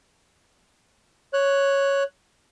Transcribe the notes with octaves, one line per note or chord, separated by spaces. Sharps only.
C#5 F#6